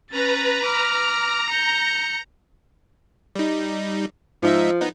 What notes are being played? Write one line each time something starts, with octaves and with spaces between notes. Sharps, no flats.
C#4 B4 A#5 A6
A#5 D6 F6
G6 C#7
G3 D#4
G#2 F3 D#4 E5
B3 D#4